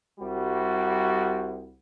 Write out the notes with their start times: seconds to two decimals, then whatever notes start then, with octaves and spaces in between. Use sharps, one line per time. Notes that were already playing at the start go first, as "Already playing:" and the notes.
0.20 C2 G3 F#4